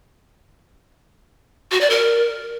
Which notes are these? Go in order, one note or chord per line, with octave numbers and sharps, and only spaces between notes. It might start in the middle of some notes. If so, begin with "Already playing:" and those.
F#4
D5
A#4